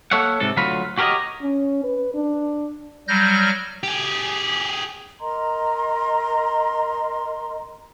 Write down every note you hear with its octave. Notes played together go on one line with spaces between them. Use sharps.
A#3 A4 C#5 E5 F#5
G#2 C3 A4
D2 F#3 F4 F#4 B5
F#4 G4 A#4 B4 C#5 D#5
C#4
B4
D4
F#3 G3 F6 G6 A#6
G4 G#4
A#4 D#5 A#5 C6